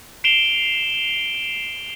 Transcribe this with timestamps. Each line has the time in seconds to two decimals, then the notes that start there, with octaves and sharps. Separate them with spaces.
0.24 C7 D7 E7 F7 G7